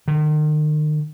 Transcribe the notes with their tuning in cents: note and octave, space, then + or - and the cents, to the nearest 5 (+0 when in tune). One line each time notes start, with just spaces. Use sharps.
D#3 -40